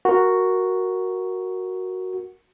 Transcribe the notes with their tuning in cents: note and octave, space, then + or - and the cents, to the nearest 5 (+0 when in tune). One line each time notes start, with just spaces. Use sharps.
F#4 +0 A#4 +0